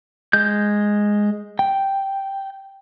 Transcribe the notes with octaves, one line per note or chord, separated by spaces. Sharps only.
G#3 G6
G5